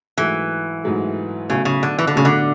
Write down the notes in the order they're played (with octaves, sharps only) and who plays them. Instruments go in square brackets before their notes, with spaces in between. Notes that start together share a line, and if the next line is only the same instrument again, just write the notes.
[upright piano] G#2 F#3 A3 [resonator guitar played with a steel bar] E3
[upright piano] G#2 F#3 A3
[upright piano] B1 A2 F#3 [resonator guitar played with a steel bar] C#3
[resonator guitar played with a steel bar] C#3
D3
E3
D3
[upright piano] B1 A2 F#3 [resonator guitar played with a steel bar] C#3
[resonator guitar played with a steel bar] D3